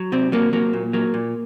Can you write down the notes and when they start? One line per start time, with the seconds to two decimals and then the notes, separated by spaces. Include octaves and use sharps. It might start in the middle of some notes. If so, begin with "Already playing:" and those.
Already playing: F#3
0.12 C3 C4
0.32 F#3 A#3
0.53 F#3 A#3
0.73 A#2
0.93 F#3 A#3
1.14 A#2